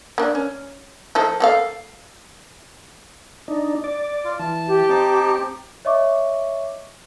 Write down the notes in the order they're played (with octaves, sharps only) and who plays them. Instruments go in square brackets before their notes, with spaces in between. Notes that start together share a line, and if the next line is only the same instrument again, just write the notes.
[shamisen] A#3 D4
C#4
F3 D#4 A4
A#3 A4 F5
[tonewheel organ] D4 D#4
D5
[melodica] F4
[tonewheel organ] E3 [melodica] A5
[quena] G4
[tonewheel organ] C4 [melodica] D#4 A5 D6
[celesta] C#5 D#5 E5 C#6 D6